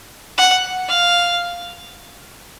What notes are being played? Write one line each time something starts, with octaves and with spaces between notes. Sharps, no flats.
F#5
F5